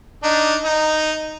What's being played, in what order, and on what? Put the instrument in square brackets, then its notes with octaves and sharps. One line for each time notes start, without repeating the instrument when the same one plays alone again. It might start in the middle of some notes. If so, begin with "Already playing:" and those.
[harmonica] D4 D#4
D#4